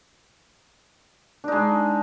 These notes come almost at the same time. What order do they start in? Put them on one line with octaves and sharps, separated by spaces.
D4 D#4 G#3